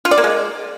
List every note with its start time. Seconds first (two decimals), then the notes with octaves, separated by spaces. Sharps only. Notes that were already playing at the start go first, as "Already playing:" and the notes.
0.05 F4
0.11 D5
0.18 A#3
0.24 G#3